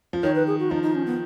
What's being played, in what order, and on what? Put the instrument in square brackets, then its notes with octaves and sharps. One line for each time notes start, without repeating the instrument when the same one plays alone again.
[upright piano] F3
[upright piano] D#3 [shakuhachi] C#5
[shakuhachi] B4
G#4
F#4
[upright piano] F3 [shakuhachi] D#4
[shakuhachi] D#4
C#4
B3